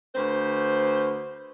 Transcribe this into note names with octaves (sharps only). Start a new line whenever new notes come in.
D2 B4 C5